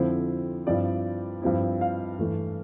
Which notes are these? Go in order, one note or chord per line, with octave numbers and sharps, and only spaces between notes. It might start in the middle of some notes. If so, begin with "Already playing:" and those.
Already playing: F2 D3 F3 C4 E4 C5
G2 F3 C4 E4 D5
G2 F3 C4 E4
F5
G2 E3 A3